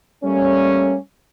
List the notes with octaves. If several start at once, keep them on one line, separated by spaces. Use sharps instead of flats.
G3 A3 A#3 C#4